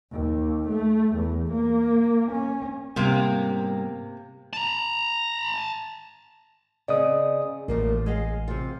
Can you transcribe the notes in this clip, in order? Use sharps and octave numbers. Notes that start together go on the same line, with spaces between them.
D#2
A3
E2
A#3
C#4
G#2 C3 G3 A#3 B3
A5 A#5
C#3 C4 D5 D#5 D#6
A1 A2 F3 A#3
G#3 D#5 F5
C3 F4